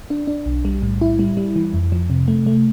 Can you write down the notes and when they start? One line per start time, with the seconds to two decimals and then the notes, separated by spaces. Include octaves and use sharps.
0.10 D4
0.27 D4
0.46 B1
0.65 G3
0.82 A2
1.01 E4
1.19 G3
1.37 G3
1.56 E3
1.74 F2
1.92 F3
2.10 C3
2.28 A3
2.47 A3